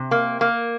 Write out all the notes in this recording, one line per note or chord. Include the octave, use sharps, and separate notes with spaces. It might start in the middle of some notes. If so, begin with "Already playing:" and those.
Already playing: C3
A#3
A#3